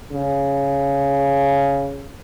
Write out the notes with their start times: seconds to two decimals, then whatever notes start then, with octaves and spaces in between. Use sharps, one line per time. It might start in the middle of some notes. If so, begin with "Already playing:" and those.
0.12 C#3